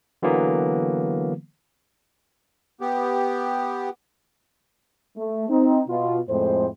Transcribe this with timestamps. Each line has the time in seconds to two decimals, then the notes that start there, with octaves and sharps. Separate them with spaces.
0.23 D3 E3 F#3 A#3 B3
2.81 B3 G4
5.17 A3
5.49 C4 D#4
5.89 B2 F4
6.29 F2 A2 G#3 C4 C5